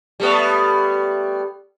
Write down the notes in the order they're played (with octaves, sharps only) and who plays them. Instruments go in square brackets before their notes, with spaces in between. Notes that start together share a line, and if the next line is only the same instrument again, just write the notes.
[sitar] G3 A3 B3